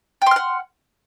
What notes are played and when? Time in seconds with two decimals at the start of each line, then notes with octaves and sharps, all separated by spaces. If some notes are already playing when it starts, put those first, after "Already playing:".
0.22 G5
0.26 C6
0.31 F6
0.36 F#5